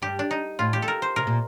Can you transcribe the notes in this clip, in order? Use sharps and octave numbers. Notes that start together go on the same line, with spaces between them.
G2 G4
D4
D#4
A2 F4
G4
A4
A#4
C5
C3 A#4
A#2